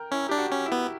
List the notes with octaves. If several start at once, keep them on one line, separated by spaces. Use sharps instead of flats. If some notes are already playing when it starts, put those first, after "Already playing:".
Already playing: A#4 G5
C#4 E4
D4 G4
F#4
C#4
E4
B3